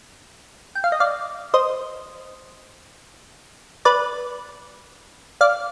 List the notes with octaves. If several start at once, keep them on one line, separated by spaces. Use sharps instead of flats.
G5
F5
D#5
D5 F5
C5 D#5
B4 D5
D5 F5